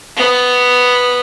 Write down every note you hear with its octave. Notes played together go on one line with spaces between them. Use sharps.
B3